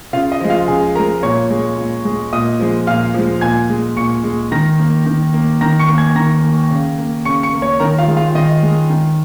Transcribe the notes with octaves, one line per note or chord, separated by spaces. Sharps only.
C#3 F4 F5
D#5
F3 G#3
F4 F5
C#3 G#4 G#5
F3 G#3 A#4 A#5
A#2 C#5 C#6
G#3
A#2
G#3
A#2 D#5 D#6
F3 G#3
A#2 F5 F6
F3 G#3
A#2 G#5 G#6
G#3
A#2 C#6 C#7
G#3
D#3 A#5 A#6
A#3
D#3
A#3
D#3 A#5 A#6
C#6 C#7
A#3
G#5 G#6
D#3 A#5 A#6
A#3
C#3
A#3
C#3 C#6 C#7
C#6 C#7
A#3
C#5 C#6
D#3 A#4 A#5
F4 F5
G#3
F4 F5
D#3 D#5
G#3
D#3